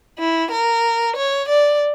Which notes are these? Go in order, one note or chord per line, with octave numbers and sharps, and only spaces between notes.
E4
A#4
C#5
D5